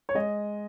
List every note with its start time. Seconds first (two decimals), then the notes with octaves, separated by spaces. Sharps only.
0.09 C#5
0.14 G#3 D#5